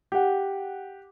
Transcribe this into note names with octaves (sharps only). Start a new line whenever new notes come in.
G4 F#5